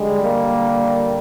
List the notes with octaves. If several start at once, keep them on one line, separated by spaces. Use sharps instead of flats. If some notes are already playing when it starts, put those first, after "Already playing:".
Already playing: D3 G3 G#3
A#3